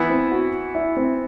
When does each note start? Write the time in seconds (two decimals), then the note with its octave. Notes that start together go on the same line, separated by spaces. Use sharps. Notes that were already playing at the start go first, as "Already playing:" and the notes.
Already playing: E3 B3 E4
0.10 C4
0.32 F#4
0.75 E4
0.97 C4